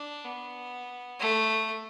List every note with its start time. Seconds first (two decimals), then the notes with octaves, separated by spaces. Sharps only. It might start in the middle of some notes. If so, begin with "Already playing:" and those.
Already playing: D4
0.25 B3
1.20 A3